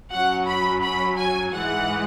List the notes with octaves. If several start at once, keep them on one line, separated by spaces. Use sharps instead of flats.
F#2 F#3 C#4 F#5
B5
B5
G#5
G#2 E3 G#3 F#5